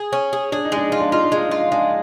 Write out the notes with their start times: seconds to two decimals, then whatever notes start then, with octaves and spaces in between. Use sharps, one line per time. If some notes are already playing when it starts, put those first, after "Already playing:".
Already playing: G#4
0.13 C#4
0.33 G#4
0.52 D4 G#4
0.65 D#4
0.72 G#3 D4
0.88 D#4 F4
1.00 D4
1.12 D#4 F4
1.24 D4
1.32 G#3 D#4
1.48 D4 F4
1.60 D#4
1.72 G#3 D4